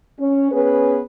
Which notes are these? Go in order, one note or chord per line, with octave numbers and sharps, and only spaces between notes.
C#4
B3 C#4 G#4 B4